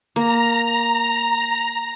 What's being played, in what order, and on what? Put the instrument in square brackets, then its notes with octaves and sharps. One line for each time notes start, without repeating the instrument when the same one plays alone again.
[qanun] A#3 [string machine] A#5